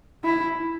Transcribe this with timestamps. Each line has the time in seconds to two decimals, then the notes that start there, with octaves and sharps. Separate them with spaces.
0.25 E4